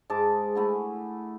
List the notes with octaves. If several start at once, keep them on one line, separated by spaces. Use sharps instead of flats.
G#2 G#3 A5 D6
A3 E4 F#4 G#5